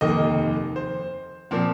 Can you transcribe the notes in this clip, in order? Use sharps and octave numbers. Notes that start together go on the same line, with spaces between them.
F1 D#2 D#3 A#3 D#5
C5
A#2 F3 C4